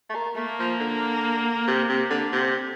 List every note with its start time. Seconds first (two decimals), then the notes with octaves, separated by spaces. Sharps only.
0.10 A3
0.15 A#3
0.36 A3 A#3
0.59 F3
0.80 D3
1.68 C3
1.89 C3
2.10 D3
2.32 C3